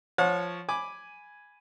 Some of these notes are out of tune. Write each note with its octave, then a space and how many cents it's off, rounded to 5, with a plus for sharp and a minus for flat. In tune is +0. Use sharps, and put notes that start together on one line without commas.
F3 +0 C#5 +0 F#5 -40
G#5 +0 B5 +0 D6 +0